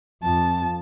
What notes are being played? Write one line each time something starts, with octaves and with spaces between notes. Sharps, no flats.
F2 F3 A5